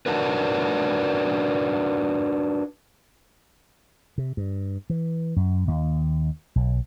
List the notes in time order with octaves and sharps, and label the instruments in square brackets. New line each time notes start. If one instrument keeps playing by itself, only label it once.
[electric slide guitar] D4 D#4 F#4 A#4 B4
[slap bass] C3
G2
E3
F#2
D#2
B1